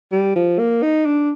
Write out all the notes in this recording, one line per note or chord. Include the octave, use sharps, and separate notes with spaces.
G3
F3
A#3
D#4
D4